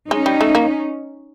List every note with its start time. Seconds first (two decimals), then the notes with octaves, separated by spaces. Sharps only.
0.11 G#3 C#4 D#4
0.26 G3
0.41 A3
0.55 A#3